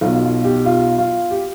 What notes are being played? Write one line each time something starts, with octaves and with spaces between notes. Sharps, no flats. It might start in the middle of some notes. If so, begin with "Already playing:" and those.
B1 B2 F4
F4
G4
F4
F4
G4